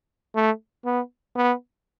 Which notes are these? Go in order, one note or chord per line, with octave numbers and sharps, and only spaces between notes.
A3
B3
B3